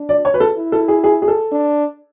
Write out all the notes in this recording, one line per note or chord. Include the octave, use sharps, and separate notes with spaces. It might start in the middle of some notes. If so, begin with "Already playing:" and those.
Already playing: D4
D5
C#5
B4
A4
E4
A4
G#4
G#4
G#4
A4
D4